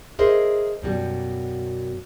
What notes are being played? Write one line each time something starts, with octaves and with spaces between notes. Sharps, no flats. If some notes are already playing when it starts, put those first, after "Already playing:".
G#4 A#4 C5 D#5 E5
F#2 B2 G3